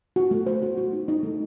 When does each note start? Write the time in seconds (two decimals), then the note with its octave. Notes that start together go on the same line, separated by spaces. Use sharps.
0.16 F#4
0.31 A3
0.47 C5
0.62 F#4
0.78 F#4
0.93 D#4
1.08 D#4
1.23 A3